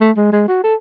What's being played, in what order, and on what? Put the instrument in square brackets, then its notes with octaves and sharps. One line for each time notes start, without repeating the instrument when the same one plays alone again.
[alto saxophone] A3
G#3
G#3
F#4
A4